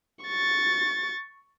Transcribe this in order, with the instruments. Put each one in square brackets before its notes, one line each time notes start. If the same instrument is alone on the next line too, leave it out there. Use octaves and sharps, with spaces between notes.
[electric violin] C#6 A6